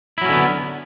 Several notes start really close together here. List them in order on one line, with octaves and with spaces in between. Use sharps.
E4 F#3 C#4 D3 B3